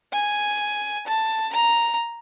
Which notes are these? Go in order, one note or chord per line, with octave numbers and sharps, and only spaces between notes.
G#5
A5
A#5